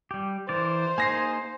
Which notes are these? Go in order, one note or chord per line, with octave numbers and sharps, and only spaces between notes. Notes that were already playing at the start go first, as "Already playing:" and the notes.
G3 G4
E3 A#4 C5 D5
A#3 D#4 G#4 G#5 A#6 C7